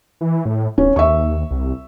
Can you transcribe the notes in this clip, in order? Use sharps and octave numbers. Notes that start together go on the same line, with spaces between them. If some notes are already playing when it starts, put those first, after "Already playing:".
E3
A2
D1 C#4
D#2 E5 C#6
C2